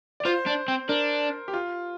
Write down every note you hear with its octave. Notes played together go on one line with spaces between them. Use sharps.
D5
F4 C5
D4
C4
D4 A#4
G4
F4